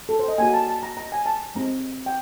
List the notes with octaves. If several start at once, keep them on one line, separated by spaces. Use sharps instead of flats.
A4
C5
D#5
A#3 D#4 F#4 G#5
A5
A5
A#5
A#5
G#5
A5
G#3 C4 D#4 A#5
G5